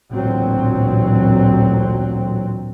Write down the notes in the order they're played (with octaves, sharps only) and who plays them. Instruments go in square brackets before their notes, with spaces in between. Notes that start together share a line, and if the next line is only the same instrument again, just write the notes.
[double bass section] A1 D2 A#2 F#3 C4